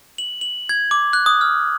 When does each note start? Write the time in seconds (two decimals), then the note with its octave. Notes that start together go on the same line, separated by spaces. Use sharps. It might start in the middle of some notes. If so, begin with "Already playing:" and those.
0.18 F#7
0.41 F#7
0.69 G#6
0.91 D6
1.13 F#6
1.26 D#6
1.41 F6